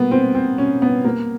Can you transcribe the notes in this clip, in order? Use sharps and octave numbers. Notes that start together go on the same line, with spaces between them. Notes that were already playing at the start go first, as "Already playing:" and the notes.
Already playing: A#3 B3
C4
C4
C#4
B3
A#3